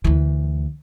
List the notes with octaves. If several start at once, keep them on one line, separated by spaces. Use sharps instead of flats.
D2 E3